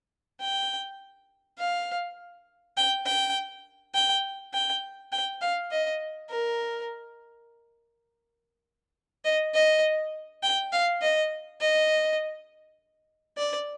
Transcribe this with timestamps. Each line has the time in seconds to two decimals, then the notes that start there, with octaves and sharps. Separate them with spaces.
0.41 G5
1.59 F5
2.77 G5
3.06 G5
3.94 G5
4.54 G5
5.12 G5
5.42 F5
5.71 D#5
6.30 A#4
9.25 D#5
9.54 D#5
10.43 G5
10.72 F5
11.02 D#5
11.61 D#5
13.38 D5